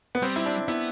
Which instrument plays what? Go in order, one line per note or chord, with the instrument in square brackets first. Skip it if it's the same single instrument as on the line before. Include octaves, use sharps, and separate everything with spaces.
[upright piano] B3
[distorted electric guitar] G3 [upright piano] C4
[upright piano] E4
D4
[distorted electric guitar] B3 [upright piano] E4